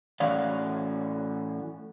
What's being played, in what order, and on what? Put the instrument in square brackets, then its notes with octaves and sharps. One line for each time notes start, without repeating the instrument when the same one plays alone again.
[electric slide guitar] A2 E3 C#4 F#4 D5 F5